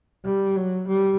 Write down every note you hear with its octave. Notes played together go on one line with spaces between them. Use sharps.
G3
F#3
G3